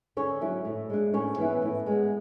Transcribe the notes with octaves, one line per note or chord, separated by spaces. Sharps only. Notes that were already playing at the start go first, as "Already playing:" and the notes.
D3 C#4 C#5
F#3 C#4 E4
A2
G#3 D4
A2 C#4 C#5
E3 B3 E4
A2
G#3 B3